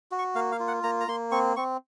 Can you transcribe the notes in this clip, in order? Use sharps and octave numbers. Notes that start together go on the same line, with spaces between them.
F#4
C#6
A#3 F5
F5
F4
F#5
A#3 A#5
A#5
A#3 C6
C4 C#6
C4 C#6